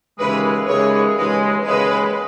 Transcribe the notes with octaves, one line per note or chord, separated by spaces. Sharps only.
D#2 C#3 E3 G#3 B4
D#2 C#3 E3 G#3 C#5
D#2 C#3 E3 G#3 B4
D#2 C#3 E3 G#3 B4